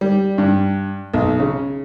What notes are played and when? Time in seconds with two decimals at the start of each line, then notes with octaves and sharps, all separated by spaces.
0.01 G3
0.38 G2
1.14 B1
1.40 C#3